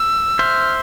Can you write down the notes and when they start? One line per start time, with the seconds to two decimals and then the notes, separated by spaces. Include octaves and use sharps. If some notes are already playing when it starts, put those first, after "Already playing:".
Already playing: E6
0.39 C5 E5 F6